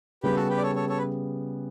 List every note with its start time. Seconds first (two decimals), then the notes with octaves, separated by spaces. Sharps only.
0.23 C#3 G3 B3 G4 B4
0.36 F#4 A4
0.49 G4 B4
0.57 D5
0.63 A4 C#5
0.75 A4 C#5
0.89 A4 C#5
0.98 B4